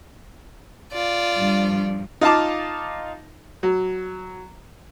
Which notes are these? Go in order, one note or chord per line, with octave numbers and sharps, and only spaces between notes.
F4 D5
G2 F3
D#4 F4 F5 A5 D6
F#3